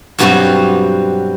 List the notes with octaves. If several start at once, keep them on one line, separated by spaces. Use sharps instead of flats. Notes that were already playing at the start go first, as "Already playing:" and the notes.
G2 B2 F#3 G3 C4 F#4